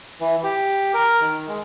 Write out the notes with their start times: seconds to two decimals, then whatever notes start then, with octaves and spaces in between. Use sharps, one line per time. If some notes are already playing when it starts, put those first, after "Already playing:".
0.21 E3
0.43 G4
0.94 A#4
1.21 D#3
1.48 G#3